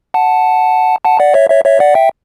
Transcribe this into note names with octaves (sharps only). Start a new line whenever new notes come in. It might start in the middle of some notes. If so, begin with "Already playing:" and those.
F#5 A5
F#5 A5
D5 F#5
C#5 E5
C#5 E5
C#5 E5
D5 F#5
E5 G5